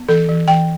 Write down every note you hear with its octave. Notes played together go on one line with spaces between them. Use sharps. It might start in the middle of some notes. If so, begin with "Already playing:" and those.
Already playing: B3
E3 A4
E3
E3 G5